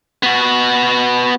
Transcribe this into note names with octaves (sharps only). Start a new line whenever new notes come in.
B3 F#4